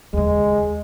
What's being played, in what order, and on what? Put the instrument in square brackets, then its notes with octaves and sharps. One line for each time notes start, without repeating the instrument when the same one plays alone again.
[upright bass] D#2 C#3 [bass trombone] G#3